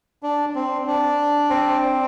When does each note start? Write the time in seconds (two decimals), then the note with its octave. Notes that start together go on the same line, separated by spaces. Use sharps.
0.23 D4
0.55 C4
0.87 D4
1.51 C4